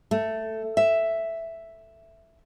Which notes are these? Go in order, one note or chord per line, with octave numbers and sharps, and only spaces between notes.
A3
E5